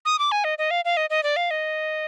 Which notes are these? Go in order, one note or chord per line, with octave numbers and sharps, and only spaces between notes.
D#6
D6
G#5
D#5
D#5
F5
F5
D#5
D#5
D5
F5
D#5